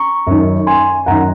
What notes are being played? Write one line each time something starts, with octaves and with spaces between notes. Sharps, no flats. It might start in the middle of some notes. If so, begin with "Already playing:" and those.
Already playing: A#5 C#6
F#2 D#3
G#5 C6
F#2 D#3 F#5 A#5